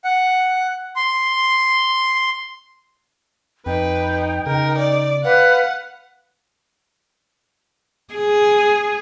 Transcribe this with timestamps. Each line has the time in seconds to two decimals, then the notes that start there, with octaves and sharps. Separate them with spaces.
0.04 F#5
0.96 C6
3.66 F2 D#4 B4 G5
4.47 C#3 D#4 A#4
4.79 D5
5.24 B4 F5 F#5
8.14 G#4